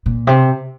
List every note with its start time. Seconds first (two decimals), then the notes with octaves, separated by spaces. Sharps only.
0.06 A#2
0.27 C3